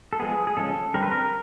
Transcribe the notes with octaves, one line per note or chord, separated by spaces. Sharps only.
A4
F3 G#3 B3 G#4
G#4
C#3 F3 G#3 C#4 A4
D3 G3 C4 A#4
B4
A#4